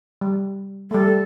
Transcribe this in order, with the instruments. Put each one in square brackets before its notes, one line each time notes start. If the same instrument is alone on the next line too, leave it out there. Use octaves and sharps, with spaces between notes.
[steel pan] G3
[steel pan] G3 A3 [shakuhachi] A4